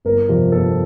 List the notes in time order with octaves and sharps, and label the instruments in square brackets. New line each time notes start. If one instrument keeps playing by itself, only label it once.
[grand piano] G1 A#4
F2 C3 F3
G1 A4